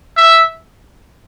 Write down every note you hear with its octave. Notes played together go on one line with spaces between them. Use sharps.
E5